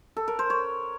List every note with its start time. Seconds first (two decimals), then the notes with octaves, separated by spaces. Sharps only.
0.17 A4
0.28 A#4
0.39 C5
0.50 C#5